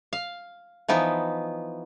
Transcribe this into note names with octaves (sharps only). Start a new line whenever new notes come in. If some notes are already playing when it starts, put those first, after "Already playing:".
F5
E3 F3 B3 D#4